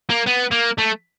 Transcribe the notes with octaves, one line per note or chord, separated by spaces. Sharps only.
A#3
B3
A#3
A3